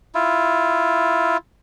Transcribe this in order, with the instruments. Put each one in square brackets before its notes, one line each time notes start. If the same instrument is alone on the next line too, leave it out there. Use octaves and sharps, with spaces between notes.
[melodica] E4 F4